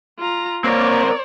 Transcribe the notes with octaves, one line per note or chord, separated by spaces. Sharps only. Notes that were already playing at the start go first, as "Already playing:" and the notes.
F4 A#5
A#3 C4 A#4 C#5 D5